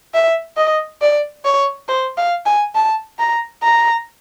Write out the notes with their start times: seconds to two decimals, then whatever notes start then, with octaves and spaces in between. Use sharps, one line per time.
0.14 E5
0.57 D#5
1.02 D5
1.45 C#5
1.89 C5
2.18 F5
2.46 G#5
2.75 A5
3.19 A#5
3.63 A#5